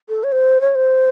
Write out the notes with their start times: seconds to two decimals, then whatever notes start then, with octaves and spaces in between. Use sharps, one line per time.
0.09 A4
0.24 C#5
0.32 C5
0.61 C#5
0.75 C5